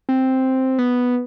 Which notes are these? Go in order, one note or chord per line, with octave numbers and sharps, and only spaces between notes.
C4
B3